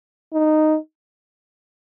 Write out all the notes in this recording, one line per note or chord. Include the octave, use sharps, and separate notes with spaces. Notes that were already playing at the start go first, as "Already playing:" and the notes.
D#4